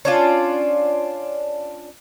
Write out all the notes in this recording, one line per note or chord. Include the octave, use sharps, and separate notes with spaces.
C#4 D4 F4